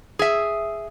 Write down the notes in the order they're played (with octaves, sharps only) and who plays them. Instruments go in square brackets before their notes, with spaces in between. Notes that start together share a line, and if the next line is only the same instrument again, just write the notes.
[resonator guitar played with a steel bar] G#4 E5